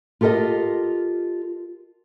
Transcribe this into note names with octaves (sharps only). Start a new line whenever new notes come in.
F4 G4 A4 A#4 D#5